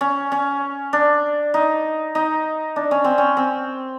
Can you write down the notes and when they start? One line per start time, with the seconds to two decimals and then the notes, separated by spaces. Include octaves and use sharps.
0.01 C#4
0.32 C#4
0.93 D4
1.54 D#4
2.15 D#4
2.76 D4
2.91 C#4
3.04 C4
3.18 C#4
3.37 C4